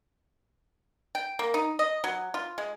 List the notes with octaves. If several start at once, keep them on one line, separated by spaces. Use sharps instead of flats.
G5
A#3
D#4
D#5
F#3
F4
G#3